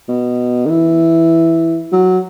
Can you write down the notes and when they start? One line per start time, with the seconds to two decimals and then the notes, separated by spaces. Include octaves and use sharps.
0.08 B2
0.65 D#3
0.70 E3
1.92 F#3